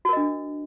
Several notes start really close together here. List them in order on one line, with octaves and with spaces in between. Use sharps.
F#4 A#4 D#5 D4